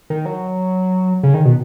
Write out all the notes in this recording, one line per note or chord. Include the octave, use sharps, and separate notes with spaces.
D#3
F#3
C#3
D#3
B2